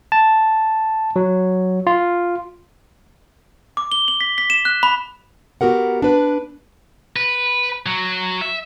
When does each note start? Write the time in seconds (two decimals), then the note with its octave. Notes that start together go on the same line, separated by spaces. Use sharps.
0.12 A5
1.16 F#3
1.87 F4
3.77 D6
3.92 G7
4.08 F#7
4.21 B6
4.38 B6
4.50 E7
4.65 F#6
4.83 B5
5.61 B3 F#4 G4 A#4 F#5
6.02 D4 B4
7.16 B4
7.86 F#3
8.41 E5